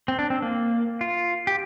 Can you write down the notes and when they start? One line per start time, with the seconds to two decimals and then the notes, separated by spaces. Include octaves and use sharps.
0.08 C4
0.19 D4
0.30 C4
0.42 A#3
1.01 F4
1.47 G4